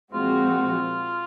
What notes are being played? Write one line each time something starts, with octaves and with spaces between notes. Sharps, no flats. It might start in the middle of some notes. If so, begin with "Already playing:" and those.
A#2 F3 G#3 C4 F4 F#4